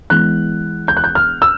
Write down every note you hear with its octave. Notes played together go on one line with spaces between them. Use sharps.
E3 G#3 B3 F#6
G6
F#6
G6
F6
E6